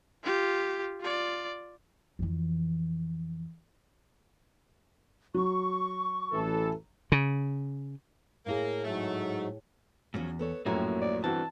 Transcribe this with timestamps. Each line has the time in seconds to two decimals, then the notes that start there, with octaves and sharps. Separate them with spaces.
0.24 F4 G4
1.01 F4 D5
2.19 F2 E3
5.34 F#3 C#6
6.32 A1 E3 A4
7.12 C#3
8.46 A2 A#3 E4 G#4
8.85 G#2 F#3 A3
10.14 E2 G#2 F3 F#3 C#4
10.39 B3 A4 C#5
10.66 A#1 F#2 A2 A#3 E4 F#4 G4 C#5
11.01 D5
11.24 G2 D3 E3 C4 F#4 A5